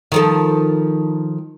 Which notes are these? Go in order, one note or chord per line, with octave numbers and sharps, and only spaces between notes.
D#3 F3 A4